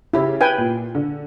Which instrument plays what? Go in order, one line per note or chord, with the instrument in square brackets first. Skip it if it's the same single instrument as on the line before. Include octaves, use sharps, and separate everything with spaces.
[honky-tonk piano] C#3 G4 [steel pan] E4
[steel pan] B4 G5 G#5
[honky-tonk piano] A#2
D3